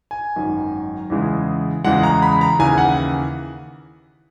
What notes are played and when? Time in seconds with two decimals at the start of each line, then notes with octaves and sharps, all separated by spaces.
0.11 G#5
0.36 G#1 F#2 D#3
1.10 E2 C#3 E3 G#3
1.84 E2 C#3 E3 G#3 F#5
2.03 A#5
2.22 B5
2.41 A#5
2.59 D#2 C#3 E3 G#5
2.78 F#5